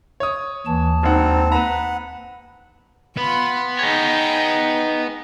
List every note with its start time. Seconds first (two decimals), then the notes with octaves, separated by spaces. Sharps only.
0.20 C#5 D#6
0.66 D#2 E3 A5
1.03 E1 C4 D#4 F#5
1.52 B4 F#5 A#5 B5
3.17 B3 F4 B5
3.79 D#4 G#4 C#5 G5